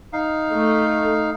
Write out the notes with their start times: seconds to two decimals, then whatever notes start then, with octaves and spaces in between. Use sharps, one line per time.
0.13 D#4 F5
0.52 A3